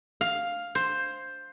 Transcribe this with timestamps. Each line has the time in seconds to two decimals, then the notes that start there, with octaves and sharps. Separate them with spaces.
0.21 F5
0.75 C5